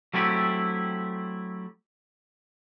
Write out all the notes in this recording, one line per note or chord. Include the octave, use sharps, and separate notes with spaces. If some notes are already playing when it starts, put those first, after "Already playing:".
F#3 A3 C4 E4 G4